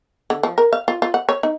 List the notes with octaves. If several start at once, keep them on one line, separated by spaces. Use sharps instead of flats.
D3
F3
A#4
F5
F4
F4
F#5
C#5
D#4